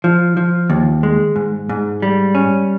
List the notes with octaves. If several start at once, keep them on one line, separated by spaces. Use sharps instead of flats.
F3
F3
D#2
G#3
G#2
G#2
G3
C#4